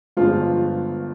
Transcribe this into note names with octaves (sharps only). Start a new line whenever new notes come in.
G1 G2 F3 G#3 F4